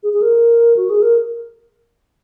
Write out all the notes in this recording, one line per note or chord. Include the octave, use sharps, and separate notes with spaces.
G#4
G#4
A#4
F#4
G#4
A#4